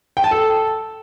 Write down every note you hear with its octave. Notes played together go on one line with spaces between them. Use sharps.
G5
A5
A4